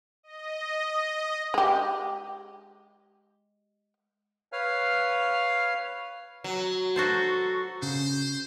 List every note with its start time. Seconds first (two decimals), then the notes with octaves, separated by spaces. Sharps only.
0.23 D#5
1.54 G#3 G4
4.52 B4 C#5 F5 F6
6.44 F#3
6.96 F#4 A4 C5
7.82 C#3 C5